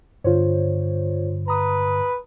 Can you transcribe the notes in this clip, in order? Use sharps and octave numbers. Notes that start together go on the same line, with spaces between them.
G2 D3 F4 C5 C#5
B4 A#5 D#6